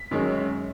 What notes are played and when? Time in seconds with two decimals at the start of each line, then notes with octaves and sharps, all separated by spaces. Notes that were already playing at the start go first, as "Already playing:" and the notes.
Already playing: B6
0.11 F#2 D#3 G#3 C#4